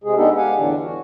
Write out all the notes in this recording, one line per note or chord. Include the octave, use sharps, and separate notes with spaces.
C3 G#3 G#4
G#3 B3 D4 D#4 G4 A4
G4 F5 F#5 G#5
E2 A2 D3 E3 D4
F#4